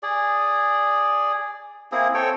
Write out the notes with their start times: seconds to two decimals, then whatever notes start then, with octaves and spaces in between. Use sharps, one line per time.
0.03 G#4 D5
1.92 A#3 C4 E4 G#4
2.14 C4 A4 C#5 G5